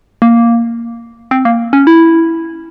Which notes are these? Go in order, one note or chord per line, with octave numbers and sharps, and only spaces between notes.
A#3
C4
A#3
C#4
E4